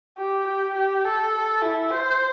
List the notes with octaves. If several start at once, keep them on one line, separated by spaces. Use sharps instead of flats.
G4
G4
G4
A4
E4
C5